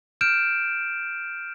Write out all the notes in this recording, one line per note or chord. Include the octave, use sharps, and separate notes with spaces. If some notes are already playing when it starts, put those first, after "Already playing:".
F6 G6 D7 E7